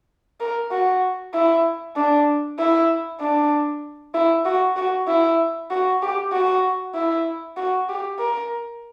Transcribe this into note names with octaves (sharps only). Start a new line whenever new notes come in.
A#4
F#4
E4
D4
E4
D4
E4
F#4
F#4
E4
F#4
G4
F#4
E4
F#4
G4
A#4